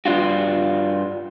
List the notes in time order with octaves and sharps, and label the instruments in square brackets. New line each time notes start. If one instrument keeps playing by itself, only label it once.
[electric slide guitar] G2 D4 F4 F#4